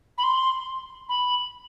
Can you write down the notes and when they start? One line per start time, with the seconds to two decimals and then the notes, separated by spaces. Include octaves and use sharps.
0.17 B5
0.23 C6
1.08 B5